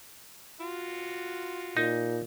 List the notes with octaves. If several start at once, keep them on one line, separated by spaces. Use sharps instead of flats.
F4 F#4
A#2 D#4